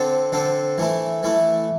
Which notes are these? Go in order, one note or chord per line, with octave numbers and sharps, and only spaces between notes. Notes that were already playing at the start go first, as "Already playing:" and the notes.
Already playing: D3 C4 A4
D3 C4 A4
E3 A3 E4
E3 A3 E4